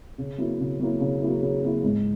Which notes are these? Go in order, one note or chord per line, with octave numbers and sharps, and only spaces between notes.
C#3
F#3 A#3 E4
C#3
F#3 A#3 E4
C#3
F#3 A#3 E4
C#3
F#3 A#3 E4
G#2